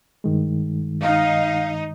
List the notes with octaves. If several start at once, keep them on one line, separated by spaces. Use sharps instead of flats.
G2 D#3 G#3
D#4 F5